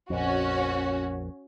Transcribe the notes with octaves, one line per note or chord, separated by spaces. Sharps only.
A#1 F2 C#4 F#4